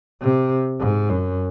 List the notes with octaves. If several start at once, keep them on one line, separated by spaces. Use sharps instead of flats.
C3
G#2
F#2